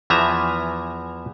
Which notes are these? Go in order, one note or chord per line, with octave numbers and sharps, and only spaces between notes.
E2 E3 F3 E5 G#5 A#5